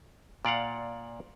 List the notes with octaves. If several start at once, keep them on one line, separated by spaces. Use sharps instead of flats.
A#2 D5 F5 F#5